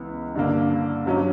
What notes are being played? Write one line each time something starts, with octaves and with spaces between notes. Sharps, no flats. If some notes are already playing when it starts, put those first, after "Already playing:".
Already playing: C#2 C#3 E3 B3
G2 D3 A#3
G2 F#3 C#4